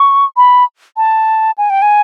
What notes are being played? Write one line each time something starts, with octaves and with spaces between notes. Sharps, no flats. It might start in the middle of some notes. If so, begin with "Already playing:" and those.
Already playing: C#6
B5
A5
G#5
G5
G#5